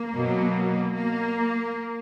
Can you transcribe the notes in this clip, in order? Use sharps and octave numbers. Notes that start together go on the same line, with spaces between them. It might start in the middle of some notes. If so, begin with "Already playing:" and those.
Already playing: A#3
B2 F#3
A#3